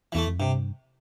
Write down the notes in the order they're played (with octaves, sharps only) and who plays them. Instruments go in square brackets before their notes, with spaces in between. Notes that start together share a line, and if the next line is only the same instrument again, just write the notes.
[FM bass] E2 [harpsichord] E3 A3
[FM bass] F2
[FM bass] G2 [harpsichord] C3